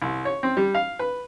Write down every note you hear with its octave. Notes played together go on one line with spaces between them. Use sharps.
C2
C#5
C4
G3
F5
B4